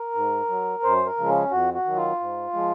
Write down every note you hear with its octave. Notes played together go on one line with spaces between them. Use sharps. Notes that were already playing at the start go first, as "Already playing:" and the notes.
Already playing: A#4
G#2
F#3
F#2 C5
A#4
C#3 F3 G#3
C#4
F2 F#4
F#4
D#3 F#3
F4
G#2
F3 G#3